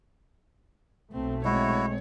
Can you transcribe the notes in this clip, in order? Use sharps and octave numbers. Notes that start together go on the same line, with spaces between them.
B1 A3 C4
G#3 C4 E4 F#4 C#5